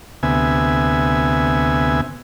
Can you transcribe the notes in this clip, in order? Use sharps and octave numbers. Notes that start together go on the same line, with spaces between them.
D2 C3 B3 E5 G#5